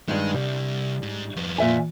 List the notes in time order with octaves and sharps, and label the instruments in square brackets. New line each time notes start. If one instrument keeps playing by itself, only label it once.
[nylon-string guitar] G2 D#3 [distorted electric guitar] G#3
[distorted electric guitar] C2 [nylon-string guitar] G3
[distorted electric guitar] G#2
F2 B3
[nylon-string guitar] A#2 E5 G#5